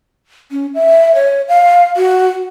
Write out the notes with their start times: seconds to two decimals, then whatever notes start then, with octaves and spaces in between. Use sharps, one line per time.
0.52 C#4
0.75 E5
1.15 C#5
1.48 F5
1.97 F#4